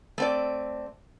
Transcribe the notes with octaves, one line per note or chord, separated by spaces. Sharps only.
A3 C4 D5